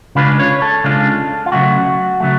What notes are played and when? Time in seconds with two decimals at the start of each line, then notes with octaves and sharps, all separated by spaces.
0.15 C#3 G#3 D4 F4 B4
0.39 C#5
0.62 A4
0.84 C#3 G#3 D4 F4
1.46 F4
1.52 C#3 F#3 A3 F#4
2.20 C#3 F#3 A3